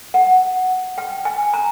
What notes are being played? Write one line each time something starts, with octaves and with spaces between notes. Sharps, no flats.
F#5
G5
G#5
A#5